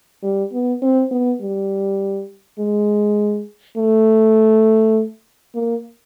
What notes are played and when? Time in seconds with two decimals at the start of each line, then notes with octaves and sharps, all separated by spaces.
0.23 G3
0.53 B3
0.82 C4
1.11 B3
1.41 G3
2.59 G#3
3.77 A3
5.55 A#3